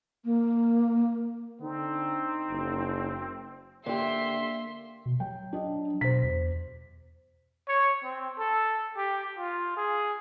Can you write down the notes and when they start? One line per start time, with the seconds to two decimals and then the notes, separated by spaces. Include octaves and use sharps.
0.25 A#3
1.61 D3 C4 D#4
2.50 F#1
3.86 D3 A#3 G4 E5 C6
5.06 B2
5.20 F#3 G5
5.53 D4 D#5
6.01 B2 C5 B6
6.23 E2
7.68 C#5
8.03 C4
8.39 A4
8.96 G4
9.39 F4
9.76 G#4